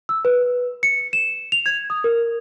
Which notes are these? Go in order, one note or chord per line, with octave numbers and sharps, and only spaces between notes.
E6
B4
C#7
E7
F7
G#6
D#6
A#4